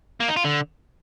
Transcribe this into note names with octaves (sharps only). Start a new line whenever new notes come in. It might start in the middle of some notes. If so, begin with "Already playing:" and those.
A#3
D#4
F4
D3